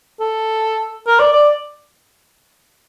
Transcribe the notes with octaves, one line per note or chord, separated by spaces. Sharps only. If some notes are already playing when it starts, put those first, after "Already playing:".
A4
A#4
D5
D5